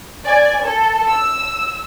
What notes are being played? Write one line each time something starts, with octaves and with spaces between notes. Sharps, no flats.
D5 G#5
A4
E6